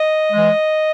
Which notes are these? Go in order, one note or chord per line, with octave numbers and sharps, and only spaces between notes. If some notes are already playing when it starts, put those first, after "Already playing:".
Already playing: D#5
E3 G#3